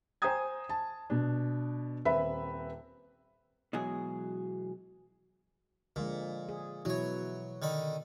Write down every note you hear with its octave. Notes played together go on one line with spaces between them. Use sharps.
C5 G5 G#5 A#5 D#6 G#6
A5
B2 D4
D#1 C4 B4 E5 B5
B2 E3 F#3 G#3 G#4
A#2 D3 F3 G#3
G#4
B2 E3 F#3 E4 C#5
D3 D#3 B5